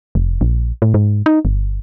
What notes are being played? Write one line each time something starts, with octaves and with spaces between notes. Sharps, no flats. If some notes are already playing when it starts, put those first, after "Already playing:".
F1
A#1
A2
G#2
D#4
G1